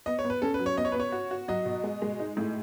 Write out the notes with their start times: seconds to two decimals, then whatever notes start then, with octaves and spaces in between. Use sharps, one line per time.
0.06 B3 D#5
0.19 C#5
0.24 B3
0.30 B4
0.42 C#4 A4
0.54 B4
0.59 F#3
0.66 C#5
0.77 B3 D#5
0.85 C#5
0.92 B4
0.95 B3
1.00 C#5
1.12 F#4
1.31 F#4
1.48 F#3 D#5
1.66 B2
1.83 G#3
2.02 G#3
2.19 D#4
2.37 A2